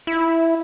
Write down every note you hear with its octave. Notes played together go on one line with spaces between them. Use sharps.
E4